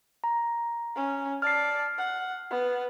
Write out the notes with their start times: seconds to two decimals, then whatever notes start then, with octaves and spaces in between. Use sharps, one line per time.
0.24 A#5
0.96 C#4
1.42 D5 A5 F6 C7
1.98 F#5
2.51 B3